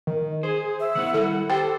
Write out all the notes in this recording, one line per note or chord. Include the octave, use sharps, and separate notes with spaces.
D#3
G#4 C5
E5
D#3 A#3 E4 F#5
D#3 G3 E4 A4
G4 A4 C5 G5